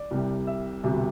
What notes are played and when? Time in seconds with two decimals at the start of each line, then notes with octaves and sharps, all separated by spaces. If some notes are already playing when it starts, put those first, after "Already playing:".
Already playing: D5
0.11 C2 C3 G3
0.47 E5
0.83 E1 D2 C3 G3